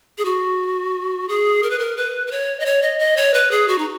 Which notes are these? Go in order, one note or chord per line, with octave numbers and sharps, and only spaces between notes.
G#4
F#4
G#4
A#4
B4
A#4
B4
B4
C#5
D#5
C#5
D#5
D#5
C#5
B4
G#4
F#4
D#4